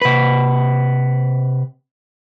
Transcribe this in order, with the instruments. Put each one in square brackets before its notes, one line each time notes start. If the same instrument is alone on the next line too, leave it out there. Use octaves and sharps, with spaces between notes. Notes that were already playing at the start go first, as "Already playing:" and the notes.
[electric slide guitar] C3 B4